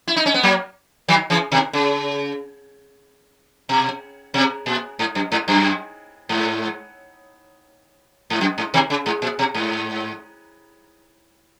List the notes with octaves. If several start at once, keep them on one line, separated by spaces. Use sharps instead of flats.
E4
D#4
C#4
B3
F#3 A#3
D#3 F#3
C#3 E3
B2 D#3
C#3
B2
B2
A#2
G#2
F#2
G#2
F#2
G#2
G#2
F#2
G#2
B2 D#3
C#3
G#2
A#2
B2
G#2